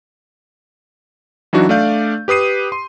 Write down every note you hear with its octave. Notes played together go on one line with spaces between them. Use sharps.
E3 F#3 D4 D#4 F#4
A3 D4 D5 F5 G6
G4 B4 D#6 C7 D#7
C6